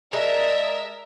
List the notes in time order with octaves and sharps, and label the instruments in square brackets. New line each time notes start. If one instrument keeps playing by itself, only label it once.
[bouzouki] G#3 [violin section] A#4 E5 [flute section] D5 A5 D#6